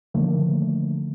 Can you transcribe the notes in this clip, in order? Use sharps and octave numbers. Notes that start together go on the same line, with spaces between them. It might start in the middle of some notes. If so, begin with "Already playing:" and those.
D3 D#3 F3 A3 A#3